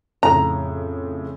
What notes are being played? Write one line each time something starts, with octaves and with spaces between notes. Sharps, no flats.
F2 A2 C#3 A#5